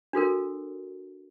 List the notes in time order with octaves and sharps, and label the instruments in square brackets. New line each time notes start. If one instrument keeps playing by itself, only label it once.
[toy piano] D4 F#4 A4 A#4